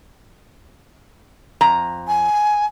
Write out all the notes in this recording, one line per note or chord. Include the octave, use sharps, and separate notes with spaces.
F2 A#5
G#5